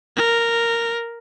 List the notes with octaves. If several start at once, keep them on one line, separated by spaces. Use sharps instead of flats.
A#4